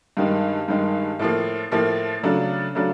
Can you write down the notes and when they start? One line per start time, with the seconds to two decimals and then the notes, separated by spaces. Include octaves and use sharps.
0.17 G2 D#3 G#3
0.68 G2 D#3 G#3
1.19 A2 F3 A#3
1.72 A2 F3 A#3
2.23 C#3 F#3 A3 D4
2.75 C#3 F#3 A3 D4